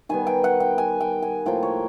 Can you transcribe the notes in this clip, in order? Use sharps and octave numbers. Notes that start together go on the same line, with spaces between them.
D#3 G3 B3 G#5
G5
F#5
G5
G#5
G5
G#5
A2 F3 A#3 G5
C#5